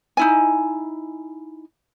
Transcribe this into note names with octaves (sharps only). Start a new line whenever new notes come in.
D#4 E4 G#5